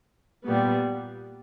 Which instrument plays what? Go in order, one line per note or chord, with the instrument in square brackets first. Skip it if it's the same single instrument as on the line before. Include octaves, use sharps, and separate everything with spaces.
[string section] A#2 G3 B3